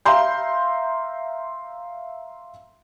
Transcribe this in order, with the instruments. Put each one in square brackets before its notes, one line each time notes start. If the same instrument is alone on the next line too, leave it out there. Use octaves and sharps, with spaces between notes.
[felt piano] E5 F5 A#5 C6 G6